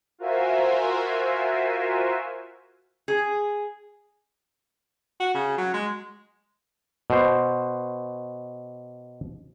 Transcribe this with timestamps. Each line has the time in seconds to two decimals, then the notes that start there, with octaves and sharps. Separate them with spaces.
0.18 F4 F#4 A#4 C5 E5 G#5
3.08 G#4
5.20 F#4
5.34 C#3
5.58 F#3
5.74 G#3
7.10 B2 C5